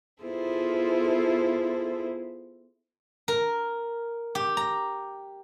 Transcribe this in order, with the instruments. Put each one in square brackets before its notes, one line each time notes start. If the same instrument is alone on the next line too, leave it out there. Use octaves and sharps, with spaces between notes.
[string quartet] B3 E4 F4 G#4 A4 C5
[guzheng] A#4
G4
A#5